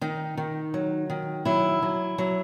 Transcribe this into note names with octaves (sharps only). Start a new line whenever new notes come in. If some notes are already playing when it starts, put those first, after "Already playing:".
D#3 D#4
D#3
F#3
D#3
F#3 E4
F#3
F#3